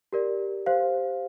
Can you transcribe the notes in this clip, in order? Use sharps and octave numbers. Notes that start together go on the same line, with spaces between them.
G4 A#4 D5
G4 C5 F5